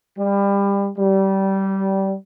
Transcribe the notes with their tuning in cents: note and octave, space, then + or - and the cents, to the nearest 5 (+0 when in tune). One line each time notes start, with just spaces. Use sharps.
G3 +25
G3 -20